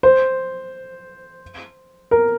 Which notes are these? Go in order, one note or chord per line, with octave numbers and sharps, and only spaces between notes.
C5
A#4